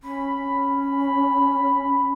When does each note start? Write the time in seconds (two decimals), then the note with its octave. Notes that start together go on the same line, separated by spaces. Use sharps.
0.03 C#4 B5
0.79 B5